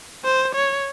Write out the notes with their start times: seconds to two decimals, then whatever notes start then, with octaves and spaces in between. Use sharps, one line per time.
0.25 C5
0.55 C#5